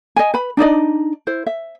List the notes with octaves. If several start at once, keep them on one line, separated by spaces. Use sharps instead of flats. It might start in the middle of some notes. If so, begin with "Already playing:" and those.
D#5 G#5
B4 B5
D4 D#4 D5 D#5
E4 C5
E5